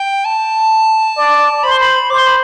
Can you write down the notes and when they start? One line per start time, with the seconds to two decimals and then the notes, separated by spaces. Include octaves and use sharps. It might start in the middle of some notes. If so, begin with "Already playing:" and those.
Already playing: G5
0.25 A5
1.17 D5
1.63 C5 B5
1.71 C6
1.80 B5
2.10 C5 D6
2.18 C6
2.27 B5